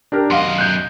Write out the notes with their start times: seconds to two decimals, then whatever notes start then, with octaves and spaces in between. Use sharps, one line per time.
0.12 D4 G4 A#4
0.31 F#2 D#5 F5 F#5 C6
0.58 F#6 G6